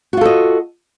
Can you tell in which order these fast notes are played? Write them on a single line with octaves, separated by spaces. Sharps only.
F#4 F4 A4 D#5